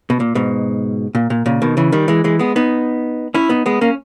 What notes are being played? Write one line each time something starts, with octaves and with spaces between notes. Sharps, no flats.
B2
A#2
G#2 B2
A#2
A#2
A#2 C#3
B2 D#3
C#3 E3
D#3 G3
E3 G#3
E3 G#3
G#3 B3
B3 D#4
C#4 E4
B3 D#4
G#3 B3
A#3 C#4